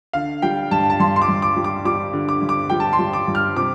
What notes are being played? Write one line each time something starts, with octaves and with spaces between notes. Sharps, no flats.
D3 F5
G3 G5
G2 A5
A5
G2 C6
C6
D6
G2
D6
G3
D6
G3 D6
D3
D6
G2
D6
G3 G5
A5
C6
G3
D6
G2
F6
C3 D6